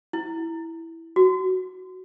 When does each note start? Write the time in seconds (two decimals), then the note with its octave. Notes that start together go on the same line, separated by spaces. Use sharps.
0.13 E4
1.16 F#4